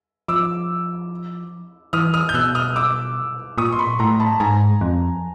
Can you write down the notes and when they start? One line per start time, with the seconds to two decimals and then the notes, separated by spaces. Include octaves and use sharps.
0.28 F3 D6 E6
1.93 E3 D#6 F6
2.14 D#6 F6
2.29 G6
2.34 B2 E6 F#6
2.55 D#6 F6
2.76 D6 E6
3.58 A#2 C#6 D#6
3.73 C6
3.79 B5 C#6
3.99 A2 A#5 C6
4.20 A5 B5
4.40 G#2 G#5 A#5
4.81 F2